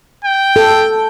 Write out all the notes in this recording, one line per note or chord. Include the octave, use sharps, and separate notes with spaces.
G5
A4